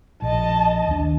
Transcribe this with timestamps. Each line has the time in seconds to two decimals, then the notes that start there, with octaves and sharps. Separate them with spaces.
0.22 A#1 D#5 A5
0.87 D#2 D4